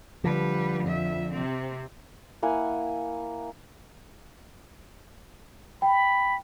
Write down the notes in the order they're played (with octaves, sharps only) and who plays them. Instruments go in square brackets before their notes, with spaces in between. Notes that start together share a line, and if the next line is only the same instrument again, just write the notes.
[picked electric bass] D3 F3 [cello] G3 B4
[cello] F2 E5
C3 C4
[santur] A#3 E4 F#5 G#5
[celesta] G5 [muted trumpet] B5